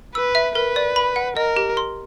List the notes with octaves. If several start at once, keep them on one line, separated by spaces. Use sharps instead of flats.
B4 E6
E5
A#4 B4
D5
B5
F#5
A#4 D#5
G4
C6